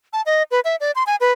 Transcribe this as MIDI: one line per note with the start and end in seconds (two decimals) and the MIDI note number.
0.13 0.22 81
0.26 0.43 75
0.51 0.60 71
0.65 0.76 76
0.81 0.91 74
0.96 1.03 84
1.07 1.16 80
1.21 1.32 71